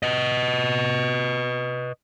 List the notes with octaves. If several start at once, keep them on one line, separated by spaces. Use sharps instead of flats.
B4 D#5